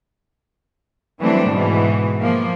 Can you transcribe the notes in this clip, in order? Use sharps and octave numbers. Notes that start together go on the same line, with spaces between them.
E3 F#3 G3 A3 C4 D4
G#2 B2 E3
F3 A#3